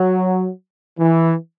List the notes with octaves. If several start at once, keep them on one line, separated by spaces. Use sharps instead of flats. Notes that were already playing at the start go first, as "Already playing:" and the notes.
Already playing: F#3
E3